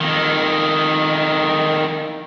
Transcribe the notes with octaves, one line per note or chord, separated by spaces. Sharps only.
F2 D#3